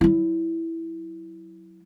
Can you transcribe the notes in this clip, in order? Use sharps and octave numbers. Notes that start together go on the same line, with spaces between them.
F#3 E4